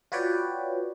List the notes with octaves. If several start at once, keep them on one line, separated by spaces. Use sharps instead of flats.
F4 F#4 B4 C#5 D5 G5